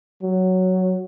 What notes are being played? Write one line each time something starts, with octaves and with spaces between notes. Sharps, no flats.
F#3